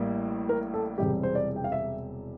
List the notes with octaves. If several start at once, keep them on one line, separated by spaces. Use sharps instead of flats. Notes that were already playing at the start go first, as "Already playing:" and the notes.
Already playing: A1 A2 G3 A#3
A#4
A4
E1 E2 C3 G3 G4
C5
D5
G5
F5
E5